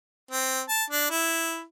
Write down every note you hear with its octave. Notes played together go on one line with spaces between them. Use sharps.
C4
A5
D4
E4